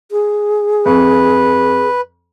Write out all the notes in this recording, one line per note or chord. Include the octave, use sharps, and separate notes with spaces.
G#4
F2 B4